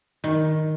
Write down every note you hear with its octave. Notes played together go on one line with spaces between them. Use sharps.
D#3